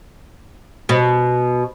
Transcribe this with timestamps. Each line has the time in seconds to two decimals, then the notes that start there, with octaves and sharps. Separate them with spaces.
0.89 B2